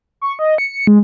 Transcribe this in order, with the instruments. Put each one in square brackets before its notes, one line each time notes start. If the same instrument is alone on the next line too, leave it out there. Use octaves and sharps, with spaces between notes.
[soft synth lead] C#6
D#5
C#7
C#7
G#3